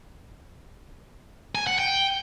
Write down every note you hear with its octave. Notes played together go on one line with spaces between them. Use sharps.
G#5
F#5
G5